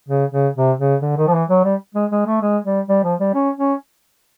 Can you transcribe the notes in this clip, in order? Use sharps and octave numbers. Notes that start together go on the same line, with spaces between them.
C#3
C#3
C3
C#3
D3
D#3
F3
E3
F#3
G3
G#3
G#3
A3
G#3
G3
G3
F3
G3
C#4
C#4